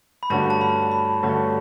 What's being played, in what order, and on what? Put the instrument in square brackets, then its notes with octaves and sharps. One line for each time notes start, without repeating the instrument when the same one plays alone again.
[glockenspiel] B5
[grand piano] G2 D3 A3 C#4 F#4 [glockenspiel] A5
[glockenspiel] A5
B5
B5
[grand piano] G2 D3 A3 C#4 F#4